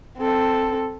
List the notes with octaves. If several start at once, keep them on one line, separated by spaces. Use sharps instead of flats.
C4 A4